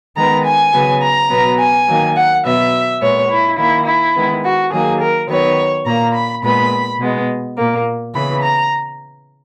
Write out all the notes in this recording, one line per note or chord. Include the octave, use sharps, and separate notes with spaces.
D#3 G#3 B3 A#5
G#5
C#3 F#3 B3
A#5
B2 F#3 B3
G#5
D#3 F#3 A#3
F#5
B2 F#3 B3 E5
A#2 G#3 B3 C#5
E4
D#3 A#3 E4
E4
D#3 G#3 B3
F#4
D#3 F#3 A#3 G#4
A#4
D#3 F#3 B3 C#5
A#2 A#3 A#5
B5
A#2 G#3 B3 B5
B2 G#3 B3
A#2 A#3
C#3 E3 B3 B5
A#5